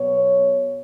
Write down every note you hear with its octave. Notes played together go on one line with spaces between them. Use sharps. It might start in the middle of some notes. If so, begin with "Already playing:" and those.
Already playing: B2 F#3 B3 C#5